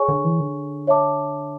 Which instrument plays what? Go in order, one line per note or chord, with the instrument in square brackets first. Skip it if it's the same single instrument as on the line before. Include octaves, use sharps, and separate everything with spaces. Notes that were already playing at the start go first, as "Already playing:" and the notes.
Already playing: [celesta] G#4 C#5 G#5 C#6
[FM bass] D3
E3
D3
[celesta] C#5 E5 A5 D6